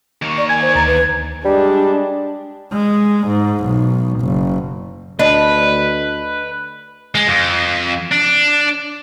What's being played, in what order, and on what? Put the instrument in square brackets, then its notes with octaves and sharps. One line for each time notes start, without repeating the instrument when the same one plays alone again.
[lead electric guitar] D#2 A#3 [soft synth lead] C#6
[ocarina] D5
[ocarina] G#5 [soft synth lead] G#6
[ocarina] C5
[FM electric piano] D2 A6 [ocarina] A#5
[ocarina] B4
[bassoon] G3 [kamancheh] G#3 D4
[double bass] G#3
G#2
B1
F#1
[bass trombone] D2 [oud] D4 [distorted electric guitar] B4 [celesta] D#5
[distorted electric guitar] G#3
F2
D4